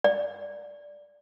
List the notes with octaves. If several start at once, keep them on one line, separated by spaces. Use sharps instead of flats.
D5